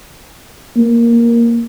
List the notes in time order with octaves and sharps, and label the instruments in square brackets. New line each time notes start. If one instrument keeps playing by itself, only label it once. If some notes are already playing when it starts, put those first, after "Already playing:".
[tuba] A#3